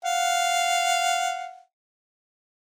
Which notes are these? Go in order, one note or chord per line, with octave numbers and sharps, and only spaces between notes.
F5 F#5